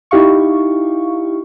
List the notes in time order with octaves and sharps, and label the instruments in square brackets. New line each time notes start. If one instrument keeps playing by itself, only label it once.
[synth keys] D#4 E4 G4 F5 C#6